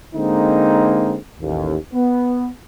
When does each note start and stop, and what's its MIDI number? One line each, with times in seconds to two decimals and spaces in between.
0.15 1.17 50
0.15 1.17 56
0.15 1.17 58
0.15 1.17 60
0.15 1.17 63
1.41 1.77 33
1.41 1.77 39
1.93 2.49 59